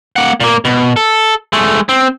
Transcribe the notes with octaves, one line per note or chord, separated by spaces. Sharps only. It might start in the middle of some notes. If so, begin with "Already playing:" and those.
A#3 F#5
A#2 A#3
B2
A4
G#3 A3
C4